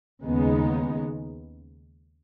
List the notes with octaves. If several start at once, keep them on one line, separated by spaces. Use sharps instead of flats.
D#2 C#3 G#3 B3 D#4